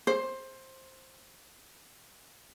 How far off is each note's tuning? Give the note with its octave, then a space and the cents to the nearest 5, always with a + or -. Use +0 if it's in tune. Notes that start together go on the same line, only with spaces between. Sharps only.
C5 +15